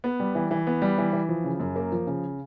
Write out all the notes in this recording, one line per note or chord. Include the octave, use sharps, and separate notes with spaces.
B3
G3
E3
E3
B3
G3
E3
E3
F3
C#3
F#2
A#3
F3
C#3